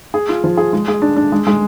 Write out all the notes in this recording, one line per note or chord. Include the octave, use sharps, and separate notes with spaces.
G#4
F4
F3
G#4
G#3
G#4
D4
D4
G#3
G#3